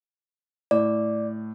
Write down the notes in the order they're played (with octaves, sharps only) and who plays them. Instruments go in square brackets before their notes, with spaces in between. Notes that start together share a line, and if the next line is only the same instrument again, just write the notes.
[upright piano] A2 [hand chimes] D5